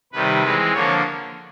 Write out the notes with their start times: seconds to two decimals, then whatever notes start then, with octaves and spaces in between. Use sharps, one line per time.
0.13 C3 D#3 G3 B4
0.43 E3 G#3 C4
0.73 D3 F3 A#3 C#5